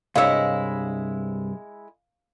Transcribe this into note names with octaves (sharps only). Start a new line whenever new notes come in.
C2 G2 G#3 E4 C#5 F5 E6